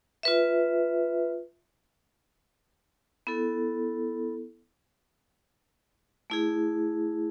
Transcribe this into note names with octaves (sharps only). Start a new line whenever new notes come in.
F4 B4 E5
B3 E4 A4
A3 E4 G#4